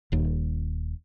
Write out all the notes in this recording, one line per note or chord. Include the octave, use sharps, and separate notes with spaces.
D#1 D#2